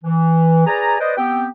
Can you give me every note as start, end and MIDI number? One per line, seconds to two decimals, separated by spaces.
0.04 0.66 52
0.67 0.96 68
0.67 0.96 71
0.67 0.96 74
0.67 0.96 80
0.67 0.96 82
1.00 1.14 71
1.00 1.14 72
1.00 1.14 74
1.00 1.14 75
1.17 1.47 59
1.17 1.47 60
1.17 1.47 67
1.17 1.47 79